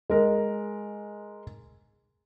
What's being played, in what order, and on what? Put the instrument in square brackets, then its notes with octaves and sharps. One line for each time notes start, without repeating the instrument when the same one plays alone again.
[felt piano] G#3 A#4